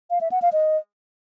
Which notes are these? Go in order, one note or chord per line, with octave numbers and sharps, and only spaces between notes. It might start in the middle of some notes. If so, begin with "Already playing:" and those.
F5
E5
F#5
F5
D#5